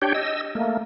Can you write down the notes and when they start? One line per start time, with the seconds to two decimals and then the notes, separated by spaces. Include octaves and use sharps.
0.02 D4 G4 C#5 G5
0.15 D#5 E6
0.55 A3 A#3